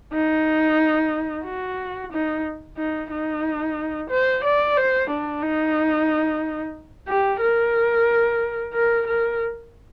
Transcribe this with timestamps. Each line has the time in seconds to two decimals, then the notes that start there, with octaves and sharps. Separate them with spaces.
0.14 D#4
1.45 F#4
2.12 D#4
2.77 D#4
3.11 D#4
4.10 C5
4.44 D5
4.76 C5
5.10 D4
5.42 D#4
7.08 G4
7.40 A#4
8.73 A#4
9.07 A#4